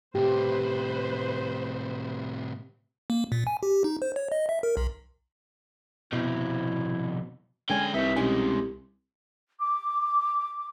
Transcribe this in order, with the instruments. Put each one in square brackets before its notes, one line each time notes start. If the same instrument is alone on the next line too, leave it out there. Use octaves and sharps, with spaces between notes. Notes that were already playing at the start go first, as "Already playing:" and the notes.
[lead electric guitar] A2 C3 [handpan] G4 [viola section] B4 C5
[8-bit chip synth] A#3
A#2
G#5
G4
D#4
C5
C#5
D#5
E5
A#4
B1
[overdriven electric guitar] C2 F2 [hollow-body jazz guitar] B2 [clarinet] E4
[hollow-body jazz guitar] D3 G#3 C#5 [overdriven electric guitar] C#4 G5 [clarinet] G#5
[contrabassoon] C2 [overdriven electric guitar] D#4 C#5 [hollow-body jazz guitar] B4 [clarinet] E5
[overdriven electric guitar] B2 G#3 [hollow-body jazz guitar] C#4 D#4 G#5 [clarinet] G4
[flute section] D6